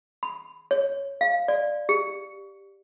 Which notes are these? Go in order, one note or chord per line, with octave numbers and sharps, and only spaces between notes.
B5
C#5
F5
D5
G4